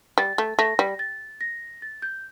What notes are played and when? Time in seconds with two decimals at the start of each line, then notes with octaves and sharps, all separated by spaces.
0.18 G3 A6
0.38 A3
0.59 A3 A#6
0.79 G3
0.99 A6
1.41 A#6
1.82 A6
2.02 G6